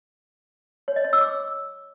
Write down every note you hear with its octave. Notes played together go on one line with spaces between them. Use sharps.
C#5
D#5
C#5
E6
D6